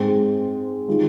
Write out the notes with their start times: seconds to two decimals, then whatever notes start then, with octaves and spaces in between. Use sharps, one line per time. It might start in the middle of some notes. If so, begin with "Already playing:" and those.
Already playing: G#2 G#3 C4
0.88 D#3 G#3 F4